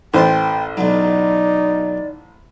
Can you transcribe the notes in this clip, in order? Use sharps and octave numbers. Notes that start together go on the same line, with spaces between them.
A1 B4 C5 G5 A5
B1 F#3 D#4 D5